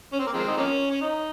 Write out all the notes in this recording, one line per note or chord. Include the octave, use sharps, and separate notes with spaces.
C#4
C4
A#3
F3 G#3 C4
D#4
F3 A#3 C#4
C#4
D#4